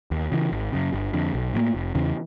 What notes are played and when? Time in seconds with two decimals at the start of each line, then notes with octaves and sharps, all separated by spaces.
0.11 D#2
0.32 C#3 E3
0.52 G#1
0.72 F#2 C#3
0.93 G1
1.13 F2 D3
1.34 B1
1.54 A2 F3 A#3
1.75 F1
1.95 E2 C#3 E3